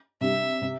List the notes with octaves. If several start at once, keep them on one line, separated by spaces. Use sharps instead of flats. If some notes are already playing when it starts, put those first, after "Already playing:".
C3 G3 D4 E5
C3